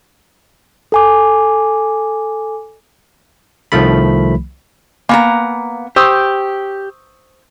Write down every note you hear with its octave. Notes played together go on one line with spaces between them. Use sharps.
A4 G#5 D6
C2 D#3 F3 A3 B5
A#3 B3 G#5 A#5
G4 C5 C#6 D#6 E6